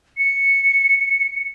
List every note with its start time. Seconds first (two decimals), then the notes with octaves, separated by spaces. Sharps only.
0.17 C#7